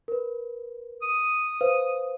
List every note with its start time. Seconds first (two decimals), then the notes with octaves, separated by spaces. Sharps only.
0.08 A#4 B4
1.02 D#6
1.61 B4 C5 F5